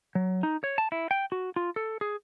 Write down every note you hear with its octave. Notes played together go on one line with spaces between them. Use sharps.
F#3
D#4
C#5
A5
E4
G5
F#4
F4
A4
G#4